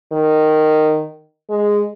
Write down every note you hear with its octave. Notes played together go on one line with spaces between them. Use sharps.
D#3
G#3